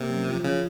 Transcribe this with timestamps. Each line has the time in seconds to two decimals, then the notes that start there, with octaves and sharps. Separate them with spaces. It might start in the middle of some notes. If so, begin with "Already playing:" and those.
Already playing: C3 A#3
0.09 F#2
0.27 F3
0.44 C#3 F3